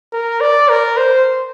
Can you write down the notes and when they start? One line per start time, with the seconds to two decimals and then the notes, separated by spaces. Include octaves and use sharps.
0.13 A#4
0.41 D5
0.69 A#4
0.97 C5